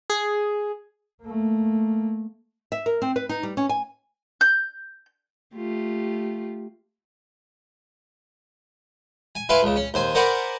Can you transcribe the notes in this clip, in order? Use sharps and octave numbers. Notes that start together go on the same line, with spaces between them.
G#4
A3 A#3
E5
A#4
C4
B4
D#4
G3
C#4
G#5
G6
A3 F4 G4
G#5
E4 B4 F5 G#5 C6
C#2 C#3
C#4
D#2 C5 G#5
A#4 C5 D5 F#5 G#5 B5